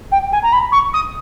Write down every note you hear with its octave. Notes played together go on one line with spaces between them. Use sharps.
G5
G#5
A#5
B5
C#6
D#6